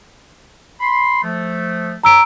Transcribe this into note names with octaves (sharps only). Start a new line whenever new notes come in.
B5 C6
F3 A3
A#5 E6 D7